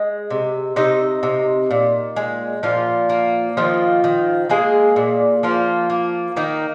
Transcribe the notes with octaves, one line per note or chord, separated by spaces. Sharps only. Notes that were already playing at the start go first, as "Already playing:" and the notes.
Already playing: G#3 D#5
C3
C3 D#4 D#5
C3
A#2
G#3
A#2 F3 F4
A#3
D#3 F3 F4
D#3
G#3 A#3 G#4
A#2
F3 A#3 F4
A#3
D#3 A#3 D#4